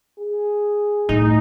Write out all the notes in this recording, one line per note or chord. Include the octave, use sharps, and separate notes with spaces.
G#4
A2 D#4